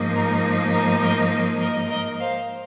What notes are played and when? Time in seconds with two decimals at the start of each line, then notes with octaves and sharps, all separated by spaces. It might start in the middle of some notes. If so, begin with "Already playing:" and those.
Already playing: G#2 F3 A#3 D#4
0.15 A#4
0.73 A#4
1.02 A#4 D#5
1.61 A#4 D#5
1.90 A#4 D#5
2.19 C5 F5